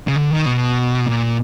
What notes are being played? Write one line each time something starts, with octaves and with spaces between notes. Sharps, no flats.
C#3
D3
D#3
B2
A#2